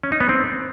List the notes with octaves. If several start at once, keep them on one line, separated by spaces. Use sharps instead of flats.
C#4
D#4
B3
C4